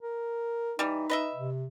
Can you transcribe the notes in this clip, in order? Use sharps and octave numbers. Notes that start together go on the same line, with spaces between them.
A#4
E3 G3 D#4
B4 D#5 E5
C3